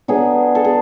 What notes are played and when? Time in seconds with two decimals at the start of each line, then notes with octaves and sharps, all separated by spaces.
0.08 D3 F#3 B3 D4 G#4
0.55 A4
0.65 G#4